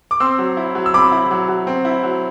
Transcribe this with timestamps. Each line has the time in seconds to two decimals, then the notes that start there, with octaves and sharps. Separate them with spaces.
0.11 D6
0.20 C4 C6 E6
0.39 F#3
0.57 E4
0.75 F#3
0.86 E6
0.93 C4 B5 D6
1.12 E4
1.31 F#3
1.48 F#3
1.67 C4
1.85 E4
2.03 F#3